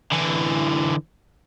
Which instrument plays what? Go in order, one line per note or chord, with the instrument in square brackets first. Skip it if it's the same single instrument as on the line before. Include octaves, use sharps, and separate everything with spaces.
[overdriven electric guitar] D3 E3